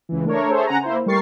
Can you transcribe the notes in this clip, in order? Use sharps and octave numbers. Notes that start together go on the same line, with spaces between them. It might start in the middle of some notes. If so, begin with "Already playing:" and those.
C#2 E3
A3 D4 A#4 C#5
G#4 A4 C5 C#5 E5
C#3 F#5 G#5 A#5
A#3 E4 C5
G3 A3 A#4 C#6 A6 C7